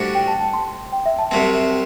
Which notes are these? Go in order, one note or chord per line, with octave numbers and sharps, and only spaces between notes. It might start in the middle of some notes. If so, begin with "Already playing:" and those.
Already playing: A2 G3 D4 F#4 C5
G5
A5
A5
C6
G5
E5
A5
C2 C3 F#3 C4